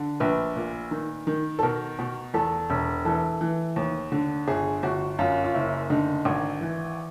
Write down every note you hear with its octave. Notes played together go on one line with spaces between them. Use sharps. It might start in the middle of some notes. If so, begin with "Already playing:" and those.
Already playing: D3
A#1 B4
A#2
D#3
D#3
A4
B2 A#4
B2
E2 A4
E1
E3 A4
E3
D#2
D3
G1 G#4
G1 F#4
F#2 F4
F4
F#1 E4
D3 D#4
G#1
E3